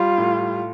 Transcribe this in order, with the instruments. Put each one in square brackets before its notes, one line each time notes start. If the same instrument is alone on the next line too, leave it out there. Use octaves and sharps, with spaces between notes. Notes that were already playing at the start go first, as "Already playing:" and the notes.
Already playing: [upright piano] G3 [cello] F4
[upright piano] A2